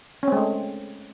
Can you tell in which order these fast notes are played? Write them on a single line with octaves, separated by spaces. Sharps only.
C#4 C4 G#3 A3